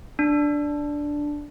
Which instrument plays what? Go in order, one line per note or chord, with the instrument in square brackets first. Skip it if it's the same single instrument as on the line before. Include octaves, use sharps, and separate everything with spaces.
[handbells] D4